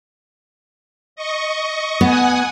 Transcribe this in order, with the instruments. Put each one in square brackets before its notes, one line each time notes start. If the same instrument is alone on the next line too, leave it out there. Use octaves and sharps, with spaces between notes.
[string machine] D#5 C#6
[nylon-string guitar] B3 [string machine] F#5 G#5 D#6